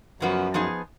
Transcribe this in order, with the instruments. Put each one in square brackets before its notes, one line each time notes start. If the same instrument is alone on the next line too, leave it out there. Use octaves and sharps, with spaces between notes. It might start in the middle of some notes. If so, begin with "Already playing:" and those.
[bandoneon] F#2 [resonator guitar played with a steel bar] C#3 F3 B3 F#4
[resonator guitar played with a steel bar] F3 B3 D#4 G#4